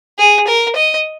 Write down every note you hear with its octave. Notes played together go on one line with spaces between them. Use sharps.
G#4
A#4
D#5